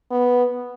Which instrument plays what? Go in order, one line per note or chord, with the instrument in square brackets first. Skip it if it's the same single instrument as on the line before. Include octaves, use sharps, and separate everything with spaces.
[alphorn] B3